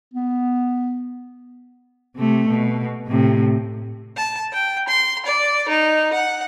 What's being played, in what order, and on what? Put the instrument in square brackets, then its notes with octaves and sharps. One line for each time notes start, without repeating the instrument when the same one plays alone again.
[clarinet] B3
[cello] C3 A3
B2
A2 C3
[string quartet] A5
G5
C6
D5
D#4
F#5